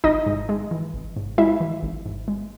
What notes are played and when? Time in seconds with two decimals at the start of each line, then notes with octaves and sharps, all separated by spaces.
0.04 G#1 D#4 D#5
0.26 G#2
0.49 G#3
0.71 E3
0.94 G#1
1.16 G#2
1.38 G#3 E4 E5
1.60 E3
1.83 G#1
2.06 G#2
2.28 G#3